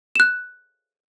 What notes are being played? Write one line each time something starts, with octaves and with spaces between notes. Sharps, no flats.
F#6 E7